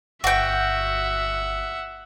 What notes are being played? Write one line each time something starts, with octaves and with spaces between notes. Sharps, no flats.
G1 F#4 E5 F#5 G5